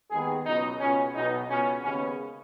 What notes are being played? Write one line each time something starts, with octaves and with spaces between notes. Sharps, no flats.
D#2 D#3 G#3 B3 G#4
C#2 B2 F#3 B3 D#4
C#2 B2 B3 C#4
B1 B2 B3 D#4
C#2 B2 B3 C#4
D#2 C#3 G#3 B3 C#4